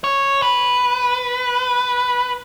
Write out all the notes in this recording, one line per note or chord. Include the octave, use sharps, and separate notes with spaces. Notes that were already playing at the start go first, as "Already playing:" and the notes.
C#5
B4